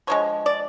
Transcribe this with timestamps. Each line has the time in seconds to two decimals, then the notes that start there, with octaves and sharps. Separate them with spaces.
0.07 D3 F3 G#3 C#5
0.46 D5